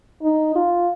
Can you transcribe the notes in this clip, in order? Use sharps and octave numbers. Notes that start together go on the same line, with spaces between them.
D#4
F4